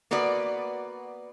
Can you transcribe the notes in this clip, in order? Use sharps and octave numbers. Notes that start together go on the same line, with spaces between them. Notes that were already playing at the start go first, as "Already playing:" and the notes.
A#3 B3 F#4 B4 D5